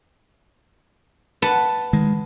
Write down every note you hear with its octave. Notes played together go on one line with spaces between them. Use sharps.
B4 F#5 A5
D#3 G#3